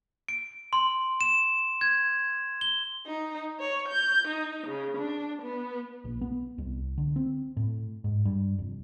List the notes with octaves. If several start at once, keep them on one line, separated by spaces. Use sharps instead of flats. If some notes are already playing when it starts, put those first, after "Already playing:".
D7
C6
E7
G#6
G7
D#4
C#5
G6
D#4
C#3
D4
B3
A#1
B3
C2
D3
C4
A2
G#2
G2
F1